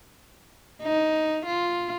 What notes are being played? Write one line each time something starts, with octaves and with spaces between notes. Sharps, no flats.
D#4
F4